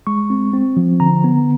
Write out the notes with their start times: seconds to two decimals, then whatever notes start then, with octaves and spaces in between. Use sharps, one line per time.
0.07 G#3 C#6
0.30 C4
0.53 C4
0.77 F3
1.00 D3 A#5
1.24 B3